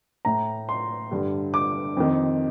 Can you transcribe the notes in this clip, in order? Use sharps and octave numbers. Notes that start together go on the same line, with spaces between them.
A2 A#5
C6
G2 D3
D6
F2 D#3